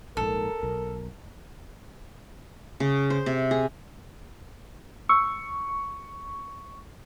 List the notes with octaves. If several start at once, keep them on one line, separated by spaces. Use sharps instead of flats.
A#1 G#2 A4 A#4
B1
C#3
C5
C3
G#4
C#6 E6